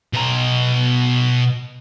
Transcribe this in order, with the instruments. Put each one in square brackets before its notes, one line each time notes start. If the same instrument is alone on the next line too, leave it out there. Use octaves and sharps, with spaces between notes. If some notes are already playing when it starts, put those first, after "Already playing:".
[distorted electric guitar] B2 A#5